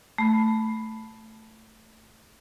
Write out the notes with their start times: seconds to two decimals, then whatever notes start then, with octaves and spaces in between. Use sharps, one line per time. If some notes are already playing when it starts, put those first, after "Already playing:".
0.18 A3 B5